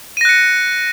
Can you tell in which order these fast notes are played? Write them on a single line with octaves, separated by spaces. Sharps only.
D#7 A#6 F#6 C#7